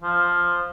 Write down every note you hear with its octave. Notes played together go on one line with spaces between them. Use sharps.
F3